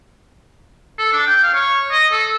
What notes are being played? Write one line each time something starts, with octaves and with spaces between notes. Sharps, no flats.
A4
D4
G5
F5
C#5
D#5
A4